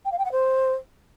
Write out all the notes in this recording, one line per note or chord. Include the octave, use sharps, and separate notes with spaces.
G5
F5
G5
F#5
C5